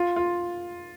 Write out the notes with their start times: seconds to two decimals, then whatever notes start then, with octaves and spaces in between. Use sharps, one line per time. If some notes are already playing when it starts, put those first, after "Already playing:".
Already playing: F4
0.16 F4